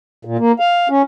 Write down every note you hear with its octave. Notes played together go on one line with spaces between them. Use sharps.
A#2
A#3
F5
C#4